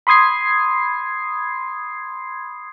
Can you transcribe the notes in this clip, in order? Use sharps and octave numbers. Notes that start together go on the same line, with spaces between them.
B5 C6 D#6 G#6 C7